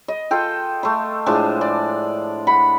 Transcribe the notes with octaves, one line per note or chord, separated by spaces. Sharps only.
D#5
F4 A4 G5
A3 C6
A2 F3 G#3 D4
D5
F#5 B5